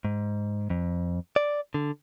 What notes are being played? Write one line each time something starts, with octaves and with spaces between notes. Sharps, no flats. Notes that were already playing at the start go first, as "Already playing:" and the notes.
G#2
F2
D5
D3